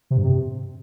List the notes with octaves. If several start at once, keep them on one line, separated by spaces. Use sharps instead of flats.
C3
G2
C3